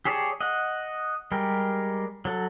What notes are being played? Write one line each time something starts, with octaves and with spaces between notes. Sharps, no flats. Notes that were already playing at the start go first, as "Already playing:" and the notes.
G4 G#4 C#5 D5 A5
D#5 F#5
G3 G#3 G4 A#4
F#3 A4